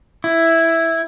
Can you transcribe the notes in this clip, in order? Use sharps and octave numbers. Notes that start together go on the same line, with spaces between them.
E4